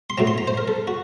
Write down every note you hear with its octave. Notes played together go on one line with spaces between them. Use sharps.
C6
A2 F#3 C4 A#5
C6
A#5
C5
A#4
A4
F#4